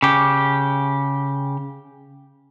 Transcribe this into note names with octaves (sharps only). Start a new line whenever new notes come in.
C#3 G4